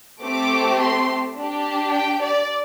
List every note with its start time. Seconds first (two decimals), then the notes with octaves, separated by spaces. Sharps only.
0.22 A3 C4 G4 D6
0.79 C6
1.36 D4 G4
1.92 G5
2.21 D5